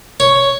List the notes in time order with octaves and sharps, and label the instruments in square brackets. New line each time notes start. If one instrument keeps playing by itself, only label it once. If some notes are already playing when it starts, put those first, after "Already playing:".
[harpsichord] C#5